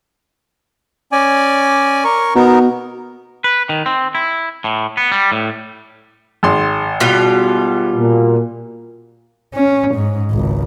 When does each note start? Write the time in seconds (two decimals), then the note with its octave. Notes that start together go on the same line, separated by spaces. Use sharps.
1.12 C#4 D5 G#5
2.04 A#4 C#6
2.35 B2 B3 D#4 A#4
3.44 B4
3.69 D#3
3.86 C4
4.15 E4
4.64 A2
4.97 B3
5.12 G3
5.32 A2
6.43 G#1 C6
7.00 B2 G3 F4
7.96 A#2
9.54 C#4
9.95 G#2
10.31 G#1 C#2